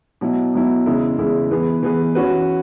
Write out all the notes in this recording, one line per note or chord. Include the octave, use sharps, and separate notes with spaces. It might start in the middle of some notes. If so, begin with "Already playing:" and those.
B2 F#3 E4
B2 F#3 E4
E2 C#3 G#3 E4
E2 C#3 G#3 E4
E3 B3 G#4 B4
E3 B3 G#4 B4
E3 C#4 F#4 B4